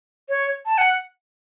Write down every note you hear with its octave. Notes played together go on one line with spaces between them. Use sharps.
C#5
A5
F#5